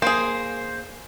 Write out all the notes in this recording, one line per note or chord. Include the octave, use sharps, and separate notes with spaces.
A#3 G#4 C5